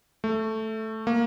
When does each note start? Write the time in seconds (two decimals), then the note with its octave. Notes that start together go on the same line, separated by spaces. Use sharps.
0.24 A3
1.07 A#3